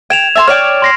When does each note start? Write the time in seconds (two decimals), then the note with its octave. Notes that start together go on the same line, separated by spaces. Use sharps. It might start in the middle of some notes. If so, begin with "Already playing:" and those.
0.10 G5 G#6 E7 F7
0.36 E5 A5 C6
0.47 C#5 D5 G5 F6 D7
0.82 C6 A#6 C7